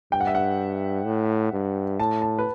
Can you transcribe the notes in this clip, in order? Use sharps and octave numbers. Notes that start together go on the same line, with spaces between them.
G2 G5
F#5
E5
F#5
A2
G2
A2 A5
A5
B4